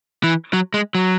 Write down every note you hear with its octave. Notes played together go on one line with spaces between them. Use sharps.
E3
F#3
G#3
F#3